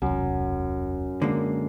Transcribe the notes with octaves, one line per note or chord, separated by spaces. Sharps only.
E1 C2 F#2
D3 G#3 A#3